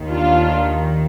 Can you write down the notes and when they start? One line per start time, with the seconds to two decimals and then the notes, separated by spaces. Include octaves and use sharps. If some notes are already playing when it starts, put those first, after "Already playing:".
Already playing: D#2 D#3
0.10 D4 F4